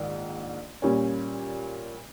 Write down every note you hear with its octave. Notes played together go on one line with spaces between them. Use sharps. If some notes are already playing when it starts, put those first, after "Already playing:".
Already playing: A#1 G#2 D#3
A#2 G3 C#4